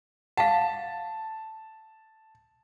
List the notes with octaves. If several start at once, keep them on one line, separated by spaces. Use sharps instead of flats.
F5 F#5 A5